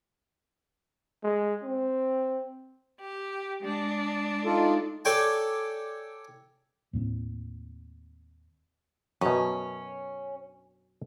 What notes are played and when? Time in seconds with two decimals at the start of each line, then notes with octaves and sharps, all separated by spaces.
1.24 G#3
1.63 C4
2.98 G4
3.62 G#3 D4
4.45 D#4 F4 A4
5.05 A4 C#5 D5 G5 G#5
6.93 D#2 A2 A#3 C4
9.21 F#2 B2 C#4